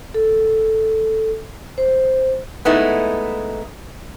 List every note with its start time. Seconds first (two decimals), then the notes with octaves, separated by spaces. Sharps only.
0.14 A4
1.78 C5
2.65 G#3 A3 B3 D#4 E4